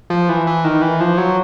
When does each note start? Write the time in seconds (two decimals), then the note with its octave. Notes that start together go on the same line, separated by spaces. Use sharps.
0.10 F3
0.29 E3
0.47 E3
0.64 D#3
0.82 E3
1.00 F3
1.18 F#3